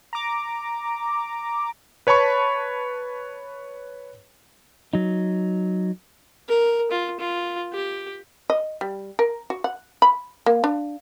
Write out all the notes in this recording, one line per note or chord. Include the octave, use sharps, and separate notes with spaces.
A#5 D6
B4 C#5 A5 B5 C#6
F#3 D#4
A#4
F4
F4
G4
D#5
G3
A#4
F#4
F#5
B5
A#3
D4